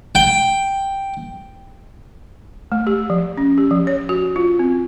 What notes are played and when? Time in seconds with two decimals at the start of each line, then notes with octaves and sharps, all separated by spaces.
0.15 G5
2.72 A3
2.87 G4
3.10 F3
3.37 C#4
3.58 G4
3.71 F3
3.87 C#5
4.09 F#4
4.36 F4
4.59 C4